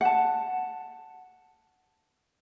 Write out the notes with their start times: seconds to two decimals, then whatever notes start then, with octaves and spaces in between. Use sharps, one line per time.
0.01 F#5 A5